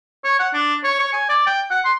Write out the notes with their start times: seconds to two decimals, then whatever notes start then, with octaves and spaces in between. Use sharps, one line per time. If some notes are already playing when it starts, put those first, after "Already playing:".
0.24 C#5
0.39 F#5
0.53 D4
0.84 C#5
0.99 C#5
1.13 G#5
1.29 D5
1.46 G5
1.70 F#5
1.85 C6